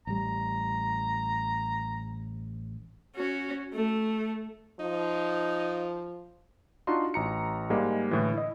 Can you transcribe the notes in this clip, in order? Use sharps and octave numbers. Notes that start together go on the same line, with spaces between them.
A1 G3 A#5
C#4 F#4
A3
F3 D#4
D4 D#4 F4 F#4 C6
A1 A#5 C#7
G#2 G3 G#3 A#3
A2 D3 E3
E4 D#5